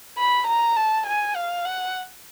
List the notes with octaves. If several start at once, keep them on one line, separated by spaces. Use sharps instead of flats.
B5
A#5
A5
G#5
F5
F#5